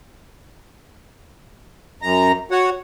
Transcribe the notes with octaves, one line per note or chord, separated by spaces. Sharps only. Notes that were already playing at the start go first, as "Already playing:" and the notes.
F#2 A#5
F#4 C#5 F#5